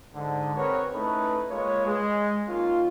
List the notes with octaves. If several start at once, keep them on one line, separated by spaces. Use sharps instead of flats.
G#2 D3
C4 F#4 G#4 A#4 B4 C#5
A3 C#4 D#4 E4 A4 B4
G#3 A#3 F4 B4 C#5
G#3
D#3 A#3 C#4 D#4 F4